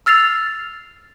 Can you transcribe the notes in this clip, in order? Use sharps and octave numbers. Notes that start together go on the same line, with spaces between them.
E6 F6 A6 C7 F7